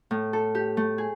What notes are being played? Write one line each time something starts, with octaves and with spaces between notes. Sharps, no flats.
A2
A4
G4
A3
G#4